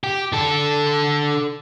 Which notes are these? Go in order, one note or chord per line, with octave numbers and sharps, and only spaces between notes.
G4
D3 A4